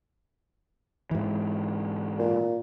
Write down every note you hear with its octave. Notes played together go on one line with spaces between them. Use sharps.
G#2 E3
A#2